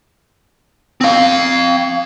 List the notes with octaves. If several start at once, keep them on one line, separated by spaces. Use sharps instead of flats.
C4 F5